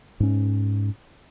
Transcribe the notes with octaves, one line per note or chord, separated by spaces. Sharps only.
G#2 C#4